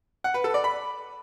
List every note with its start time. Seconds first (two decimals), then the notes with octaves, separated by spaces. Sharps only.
0.24 F#5
0.34 B4
0.44 A4
0.54 D5
0.64 B5